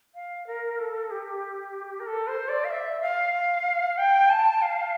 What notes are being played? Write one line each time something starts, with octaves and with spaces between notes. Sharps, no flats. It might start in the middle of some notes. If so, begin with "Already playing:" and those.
F5
A#4
A4
G4
A#4
A4
C5
D5
F5
E5
F5
G5
A5
F5